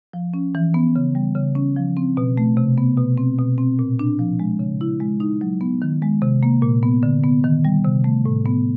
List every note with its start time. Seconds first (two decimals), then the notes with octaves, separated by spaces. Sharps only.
0.13 F3
0.34 C#4
0.55 E3
0.74 B3
0.96 C#3
1.15 G3
1.35 C#3
1.55 C#4
1.76 F3
1.97 C4
2.17 B2
2.38 A3
2.57 C3
2.78 B3
2.97 B2
3.18 C4
3.38 B2
3.58 C4
3.79 A#2
3.99 D4
4.19 F3
4.40 G#3
4.59 C#3
4.81 E4
5.00 G#3
5.20 D#4
5.41 F#3
5.61 B3
5.82 D#3
6.02 G#3
6.22 C3
6.43 A#3
6.62 A#2
6.83 B3
7.03 D3
7.24 B3
7.44 D#3
7.65 G3
7.84 C3
8.04 A3
8.26 A2
8.46 B3